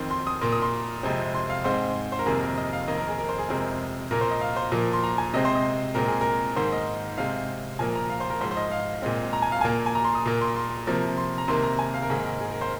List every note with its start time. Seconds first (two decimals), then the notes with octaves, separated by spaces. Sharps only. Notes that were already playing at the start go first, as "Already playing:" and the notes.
Already playing: F2 D#3 C4
0.11 C6
0.27 D#6
0.41 A#2 A#3 C6
0.52 D#6
0.62 C6
1.03 F2 C3 G#3 C4
1.34 C6
1.50 F5
1.64 G#2 G#3 C4 C5
2.12 C5
2.19 A#4
2.26 F2 C3 D#3 A#3 G#4
2.41 A#4
2.57 D#5
2.73 F5
2.88 F2 D#3 A#3 D#5
2.98 A#4
3.08 G#4
3.18 A#4
3.29 C5
3.39 G#4
3.49 F2 C3 G#3 C4 A#4
4.11 A#2 A#3 A#4
4.21 C5
4.31 D#5
4.41 F5
4.56 C5
4.72 A#2 F3 A#3
4.93 C6
5.03 A#5
5.18 G#5
5.34 C3 G#3 C4 D#5
5.45 C5
5.55 D#5
5.95 A#2 G#3 C4 A#4
6.08 G#4
6.21 A#4
6.56 G#2 D#3 A#3 C5
6.72 D#5
7.18 C3 G#3 C4 F5
7.79 A#2 F3 A#3 G#5
7.95 A#5
8.10 F5
8.20 C5
8.30 A#4
8.41 G#2 F3 G#3 C5
8.51 C5
8.57 D#5
8.71 F5
9.02 A#2 G#3 C4
9.33 A#5
9.42 G#5
9.52 F5
9.61 A#2 A#3 G#5
9.86 G#5
9.95 A#5
10.04 C6
10.15 D#6
10.25 A#2 A#3
10.41 C6
10.56 C6
10.87 C3 F3 A#3
11.17 C6
11.38 A#5
11.48 C3 D#3 A#3 C6
11.63 A#5
11.79 G#5
11.94 F5
12.02 A#4
12.10 G#2 D#3 A#3 G#4
12.25 A#4
12.41 G#4
12.51 A#4
12.61 C5